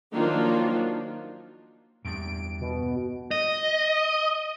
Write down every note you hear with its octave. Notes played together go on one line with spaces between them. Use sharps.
D#3 F3 F#3 A#3 D4 F4
E2 G2 D7
B2
D#5